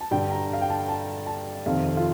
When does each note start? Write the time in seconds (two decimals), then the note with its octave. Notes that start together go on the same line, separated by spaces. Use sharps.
0.01 A5
0.11 G2 D3 G5
0.31 A#5
0.53 F5
0.61 G5
0.70 A5
0.89 A5
1.26 A5
1.66 F2 C3 D#3 F5
1.84 A4
1.97 F4